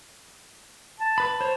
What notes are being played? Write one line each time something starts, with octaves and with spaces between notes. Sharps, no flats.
A5
B4 B5
C5 C#5